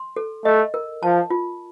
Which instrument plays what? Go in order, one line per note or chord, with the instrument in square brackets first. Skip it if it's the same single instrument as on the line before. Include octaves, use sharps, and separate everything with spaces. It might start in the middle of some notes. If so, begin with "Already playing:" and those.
Already playing: [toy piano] C6
A4
[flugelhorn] A3 [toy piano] D#5
[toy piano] A#4
[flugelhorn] F3 [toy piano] A5
[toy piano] F4